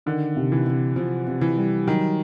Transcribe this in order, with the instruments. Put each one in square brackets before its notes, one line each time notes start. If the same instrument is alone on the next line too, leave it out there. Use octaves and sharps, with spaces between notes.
[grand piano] D3 [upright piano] D#3
[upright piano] C3
[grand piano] E3
[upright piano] C3
[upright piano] C3 [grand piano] F3
[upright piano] C3
[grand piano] E3
[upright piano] G3
[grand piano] D#3 [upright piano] F#3